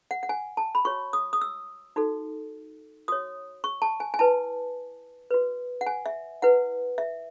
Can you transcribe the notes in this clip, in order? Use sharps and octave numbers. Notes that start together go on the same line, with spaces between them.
F#5
F#5
G#5
A5
B5
F#4 C#5 C#6
D#6
D#6
E6
D#4 F#4 A4
F#4 C#5 D#6
C#6
A5
G#5
G#5
E4 B4 A5
F#4 B4
F#5
G#5
E5
E4 B4 F#5
E5